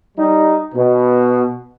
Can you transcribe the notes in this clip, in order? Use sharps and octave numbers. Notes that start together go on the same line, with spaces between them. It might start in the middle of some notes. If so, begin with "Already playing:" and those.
G3 D#4
B2